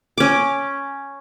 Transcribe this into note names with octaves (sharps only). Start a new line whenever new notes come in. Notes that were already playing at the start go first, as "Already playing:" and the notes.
C#4 D6